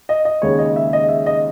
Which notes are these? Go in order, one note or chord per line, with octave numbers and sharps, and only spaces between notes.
D#5
D#5
D#2 C#3 G#3 C#5
D#5
E5
D#5
E5
D#5